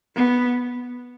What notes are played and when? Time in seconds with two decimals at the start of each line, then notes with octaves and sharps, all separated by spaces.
0.16 B3